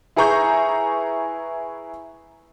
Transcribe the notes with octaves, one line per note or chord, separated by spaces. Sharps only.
E4 G#4 B4 A#5 C#6 G6